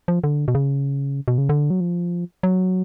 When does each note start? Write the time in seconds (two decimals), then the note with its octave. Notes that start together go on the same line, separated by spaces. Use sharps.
0.08 F3
0.24 D3
0.48 B2
0.55 C#3
1.28 B2
1.38 C#3
1.49 D3
1.70 F#3
1.80 F3
2.43 F#3